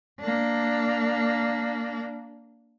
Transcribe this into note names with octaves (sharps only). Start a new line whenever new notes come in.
A#3 D4